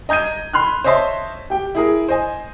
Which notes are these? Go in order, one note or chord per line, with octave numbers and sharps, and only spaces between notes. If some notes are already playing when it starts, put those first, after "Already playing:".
D#5 A#5 G6 G#6 D#7
B5 C6 F6 F#6
C5 C#5 D#5 E5 A5 C6
G4 G5
E4 G#4 A#4
C5 D#5 G#5